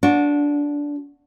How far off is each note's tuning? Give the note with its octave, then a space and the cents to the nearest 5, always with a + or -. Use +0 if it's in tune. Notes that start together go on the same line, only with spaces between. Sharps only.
D4 -15 F#4 -25